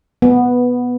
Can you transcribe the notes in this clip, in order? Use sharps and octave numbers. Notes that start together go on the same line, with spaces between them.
B3